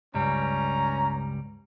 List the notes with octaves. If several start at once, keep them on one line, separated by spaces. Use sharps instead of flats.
C#2 G2 G3 C#4 A#5